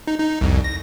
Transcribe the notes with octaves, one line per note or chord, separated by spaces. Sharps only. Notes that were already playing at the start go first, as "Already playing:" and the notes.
D#4
D#4
C2 F2
A#6